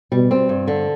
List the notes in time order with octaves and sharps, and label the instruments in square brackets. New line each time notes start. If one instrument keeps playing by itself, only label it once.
[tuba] B2 [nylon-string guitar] G3
[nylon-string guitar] C4
G2
D3